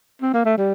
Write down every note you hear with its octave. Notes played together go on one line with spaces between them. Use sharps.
C4
A#3
A3
G3